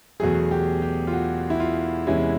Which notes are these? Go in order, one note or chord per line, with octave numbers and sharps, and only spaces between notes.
E2 B2 F#3 A3 G#4
G4
G4
F4
F#4
E4
F4
E2 C3 E3 G#3 C#4 E4